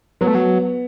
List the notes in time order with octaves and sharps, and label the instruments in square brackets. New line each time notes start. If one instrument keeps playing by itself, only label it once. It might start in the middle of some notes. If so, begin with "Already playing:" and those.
[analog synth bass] F#3 [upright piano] B3
[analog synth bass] A3
F#3